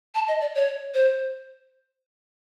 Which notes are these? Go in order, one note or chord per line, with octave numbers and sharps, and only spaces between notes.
A5
D#5
D5
C#5
C5